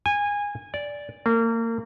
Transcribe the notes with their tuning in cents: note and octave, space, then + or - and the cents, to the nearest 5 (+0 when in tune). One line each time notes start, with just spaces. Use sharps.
G#5 -20
D5 -10
A#3 -30